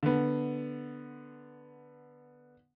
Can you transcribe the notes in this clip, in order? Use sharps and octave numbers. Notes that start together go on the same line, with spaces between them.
D3 B3